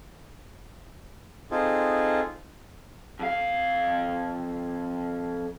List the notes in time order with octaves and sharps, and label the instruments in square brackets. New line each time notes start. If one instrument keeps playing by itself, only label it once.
[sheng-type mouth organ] C4 D#4 F4 G#4 A4
[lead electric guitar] F2 F5